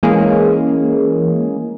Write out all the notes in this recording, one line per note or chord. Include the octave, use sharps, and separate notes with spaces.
E3 G#3 A#3 C#4 G#4